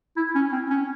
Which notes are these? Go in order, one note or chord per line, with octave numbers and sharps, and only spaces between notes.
E4
C#4
C4
C#4